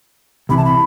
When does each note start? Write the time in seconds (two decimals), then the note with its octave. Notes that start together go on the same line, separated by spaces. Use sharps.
0.49 C2 C3 E3 B5
0.57 A5
0.65 B5